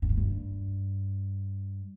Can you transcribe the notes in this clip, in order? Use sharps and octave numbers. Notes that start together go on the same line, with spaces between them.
G2
G#2
G2